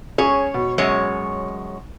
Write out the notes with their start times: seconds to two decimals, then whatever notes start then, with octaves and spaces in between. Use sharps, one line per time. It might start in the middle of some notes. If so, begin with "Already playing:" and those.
0.18 C#4 G#4 C#5
0.54 B2
0.78 F#2 G#3 C#5